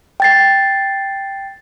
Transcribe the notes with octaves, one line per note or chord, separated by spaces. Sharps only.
G5 A6 C7